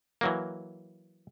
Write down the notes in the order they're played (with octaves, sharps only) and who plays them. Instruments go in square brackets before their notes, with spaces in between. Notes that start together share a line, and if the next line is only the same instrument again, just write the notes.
[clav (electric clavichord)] E3 F#3 A#3